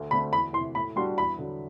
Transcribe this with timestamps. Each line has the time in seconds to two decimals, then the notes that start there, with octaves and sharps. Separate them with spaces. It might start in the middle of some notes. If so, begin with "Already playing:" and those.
Already playing: D2
0.11 D3 A3 C4 B5
0.32 E2 B5
0.53 E3 C6
0.58 C3
0.75 A2 B5
0.96 G3 D4 F#4 C6
1.18 E2 B5
1.39 D3 F#3